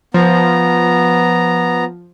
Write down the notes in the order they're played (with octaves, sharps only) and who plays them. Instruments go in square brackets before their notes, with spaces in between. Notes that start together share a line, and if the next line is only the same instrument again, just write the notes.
[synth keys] F3 [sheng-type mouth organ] B3 A#5